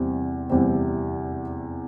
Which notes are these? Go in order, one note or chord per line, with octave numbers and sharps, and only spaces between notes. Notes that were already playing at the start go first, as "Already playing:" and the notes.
Already playing: E2 C3 G3 C4
E2 C3 G3 C4